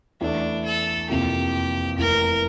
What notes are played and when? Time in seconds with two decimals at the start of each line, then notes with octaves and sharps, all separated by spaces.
0.21 E2 E3 A3 D4 E4
0.65 A4
1.09 F2 C3 E3 A#3 G4
1.98 F1 E2 E3 A#4